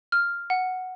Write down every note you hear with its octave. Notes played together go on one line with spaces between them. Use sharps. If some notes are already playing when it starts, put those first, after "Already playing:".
F6
F#5